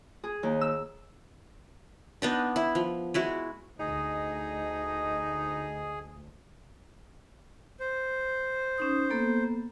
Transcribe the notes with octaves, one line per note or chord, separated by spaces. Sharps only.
G#4
D#2
E6
B3 D4 D#4
E4
F3
G#3 E4 F#4
D2 D#4 G#4 D#5
C5
C#4 D#4 D#6
A#3 B3 A4